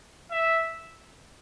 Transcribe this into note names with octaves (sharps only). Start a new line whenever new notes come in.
E5